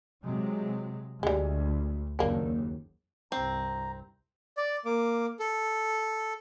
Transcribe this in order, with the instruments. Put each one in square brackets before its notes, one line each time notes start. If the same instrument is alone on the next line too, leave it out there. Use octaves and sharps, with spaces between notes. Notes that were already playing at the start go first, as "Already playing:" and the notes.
[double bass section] C3 F#3 G#3
[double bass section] D2 [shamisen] G3 G#3
[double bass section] F#1 D#2 [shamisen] A#3 D4
[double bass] C2 G2 [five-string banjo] C4 [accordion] A#5
[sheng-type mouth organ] D5
A#3 D6
A4